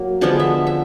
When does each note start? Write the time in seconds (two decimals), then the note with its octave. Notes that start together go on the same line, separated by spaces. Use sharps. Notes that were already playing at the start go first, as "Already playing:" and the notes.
Already playing: F#3 A#3
0.21 D3 F3 G#3 B3 A5
0.40 E5
0.67 E5